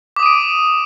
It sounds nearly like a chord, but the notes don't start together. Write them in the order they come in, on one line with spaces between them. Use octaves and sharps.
D6 D#6 D#7 D7